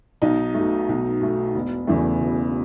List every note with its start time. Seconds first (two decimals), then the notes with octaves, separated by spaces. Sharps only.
0.22 B1 D#4
0.54 A3
0.60 B2
0.89 B1
1.22 B2 A3
1.55 E1
1.87 E2 C#3 E3 A3
2.21 E1